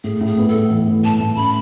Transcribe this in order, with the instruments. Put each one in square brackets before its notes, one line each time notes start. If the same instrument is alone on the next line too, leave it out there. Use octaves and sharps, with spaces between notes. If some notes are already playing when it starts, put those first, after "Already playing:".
[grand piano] A2 [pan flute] G#4
[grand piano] A2 [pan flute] G#4
[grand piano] B3
[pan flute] A4
[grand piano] A2
E3
A2
[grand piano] A2 [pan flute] A5
[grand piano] A2
[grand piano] C#4 [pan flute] B5